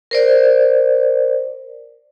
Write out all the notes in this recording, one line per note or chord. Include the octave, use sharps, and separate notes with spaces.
A#4 C5 D5